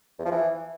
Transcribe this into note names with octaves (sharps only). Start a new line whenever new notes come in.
E2
F3
E3